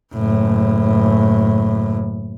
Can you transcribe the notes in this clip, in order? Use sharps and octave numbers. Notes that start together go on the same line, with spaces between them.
F#1 A2